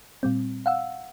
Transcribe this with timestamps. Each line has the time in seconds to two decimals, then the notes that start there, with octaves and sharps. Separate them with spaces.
0.23 A#2 G3 C4
0.66 F5 F#5 E6